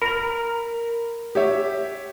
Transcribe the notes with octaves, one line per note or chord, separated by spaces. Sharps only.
A#4 B5 F7
G4 C#5 E5